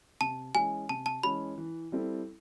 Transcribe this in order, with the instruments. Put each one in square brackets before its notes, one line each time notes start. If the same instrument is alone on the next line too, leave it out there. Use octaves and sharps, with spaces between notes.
[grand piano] C3 [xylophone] A5
[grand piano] E3 G#3 C#4 [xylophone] G#5
[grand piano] C3 [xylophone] A5
[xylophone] A5
[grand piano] E3 G#3 C#4 [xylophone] B5
[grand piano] E3
G3 C4 E4 A4